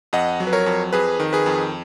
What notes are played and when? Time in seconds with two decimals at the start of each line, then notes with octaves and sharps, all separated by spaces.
0.13 F2 D#5 F#5
0.40 F#3
0.47 B4
0.53 A#4 C#5
0.66 F2
0.93 F2 G#4 B4
1.20 D#3
1.33 G#4 B4
1.46 F2